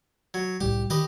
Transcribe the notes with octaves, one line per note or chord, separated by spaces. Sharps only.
F#3
C2 A2 G3 G4
D#3 G4 B4 D#5